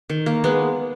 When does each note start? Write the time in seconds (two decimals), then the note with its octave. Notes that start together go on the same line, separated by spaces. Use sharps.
0.10 D#3
0.26 A#3
0.44 G#3 B3